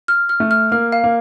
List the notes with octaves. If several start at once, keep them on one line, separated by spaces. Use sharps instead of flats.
F6
F6
A3
F6
A#3 F6
F5
A#3